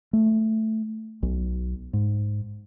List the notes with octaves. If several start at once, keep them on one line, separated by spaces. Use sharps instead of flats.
A3
B1
G#2